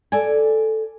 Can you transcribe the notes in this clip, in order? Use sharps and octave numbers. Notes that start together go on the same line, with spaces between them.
A4 D5 G#5